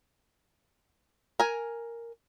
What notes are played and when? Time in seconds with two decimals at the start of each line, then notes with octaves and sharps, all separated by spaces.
1.40 A#4 G#5